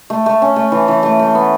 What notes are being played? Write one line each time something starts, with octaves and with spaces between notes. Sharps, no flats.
A3
A3
C#4
A3
E3
E3
A3
A3
B3